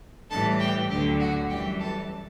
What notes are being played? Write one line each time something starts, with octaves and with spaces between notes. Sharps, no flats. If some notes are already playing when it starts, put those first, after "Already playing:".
A2 E3 G3 A4 A5
G4 G5
D2 D3 F#3 G4 G5
F#4 F#5
F#2 E3 G3 G4 G5
A4 A5